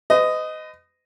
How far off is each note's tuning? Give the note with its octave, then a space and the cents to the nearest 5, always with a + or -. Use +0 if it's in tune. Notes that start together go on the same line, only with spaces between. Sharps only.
B4 +45 D#5 +0